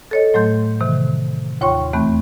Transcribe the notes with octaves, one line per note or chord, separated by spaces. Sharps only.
A4 C#5 D#5
A2 F#3 A3 C6 G6
C3 D#3 E3
D#2 F4 C#5 G5 C6 C#6
E2 E3 A3 C4 B5 F#6